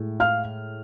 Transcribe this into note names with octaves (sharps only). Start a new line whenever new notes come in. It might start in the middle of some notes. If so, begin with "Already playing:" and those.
Already playing: A2 G#3
F5 F6